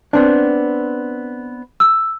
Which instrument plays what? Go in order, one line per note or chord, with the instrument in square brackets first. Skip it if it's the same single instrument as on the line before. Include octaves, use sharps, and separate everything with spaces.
[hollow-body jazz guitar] B3 C4 D4
[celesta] E6